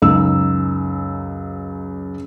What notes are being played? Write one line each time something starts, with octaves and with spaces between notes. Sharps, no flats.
C#2 F#2 D#4 E6